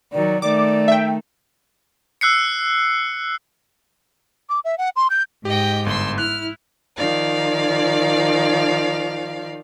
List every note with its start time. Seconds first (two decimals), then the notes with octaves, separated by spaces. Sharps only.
0.13 D#3 F#3 D5
0.42 D#3 A3 D5 D6
0.88 E5 G5
2.21 E6 F#6 C7 C#7
4.49 D6
4.65 E5
4.78 F#5
4.96 C6
5.10 G6
5.45 G#2 G4 D#5 G5
5.86 G1 C6 E6
6.18 E4 F6 F#6
6.97 D#3 F3 D5 F5